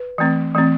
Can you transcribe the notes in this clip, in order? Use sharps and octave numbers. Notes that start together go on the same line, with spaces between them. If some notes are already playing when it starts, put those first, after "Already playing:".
Already playing: B4
E3 A3 C4
E3 A3 C4